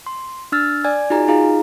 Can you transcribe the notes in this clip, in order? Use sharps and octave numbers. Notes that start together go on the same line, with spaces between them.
C6
D4 E6 F6 A6
D5 G#5 G#6
D#4 F4 F#4 G#4 G#5 A#5
D#4 F4 G#4 F5 A#5